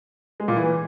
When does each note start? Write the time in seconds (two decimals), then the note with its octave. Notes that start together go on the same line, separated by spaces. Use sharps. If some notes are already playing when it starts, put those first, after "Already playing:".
0.40 G#3
0.48 A#2
0.57 E3